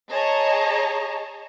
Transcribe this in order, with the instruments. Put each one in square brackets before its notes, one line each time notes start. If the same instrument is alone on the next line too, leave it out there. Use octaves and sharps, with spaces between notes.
[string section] G#4 C#5 D#5 A5 A#5